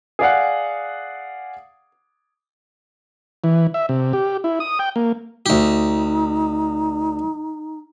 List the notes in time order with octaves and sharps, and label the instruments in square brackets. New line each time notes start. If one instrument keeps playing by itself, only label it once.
[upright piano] G#4 D5 F5 F#5
[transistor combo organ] E3
E5
C3
G4
E4
D#6
G5
A#3
[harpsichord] D2 G4 [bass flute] D#4